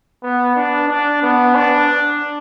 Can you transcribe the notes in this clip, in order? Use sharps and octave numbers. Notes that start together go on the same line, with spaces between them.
B3
D4
D4
B3
D4